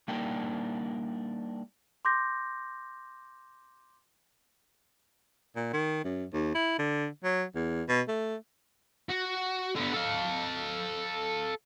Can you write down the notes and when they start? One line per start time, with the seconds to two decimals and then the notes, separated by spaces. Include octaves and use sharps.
0.08 G3 A#3 D4 D#4 A#4 G5
2.05 C6 D6 G6 A#6
5.56 A#2
5.73 D#3
6.04 F#2
6.33 D#2
6.55 E4
6.79 D3
7.24 F#3
7.55 E2
7.89 B2
8.08 A3
9.10 F#4
9.75 D3 B3
9.94 A4 F5